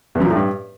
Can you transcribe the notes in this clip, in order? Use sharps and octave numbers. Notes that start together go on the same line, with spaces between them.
E2
F#2
A#2
A2
G2